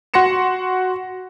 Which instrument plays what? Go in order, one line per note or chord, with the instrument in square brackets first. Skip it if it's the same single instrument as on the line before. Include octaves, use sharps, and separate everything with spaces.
[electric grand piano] F#4 F#5 C6 A#6 C#7 E7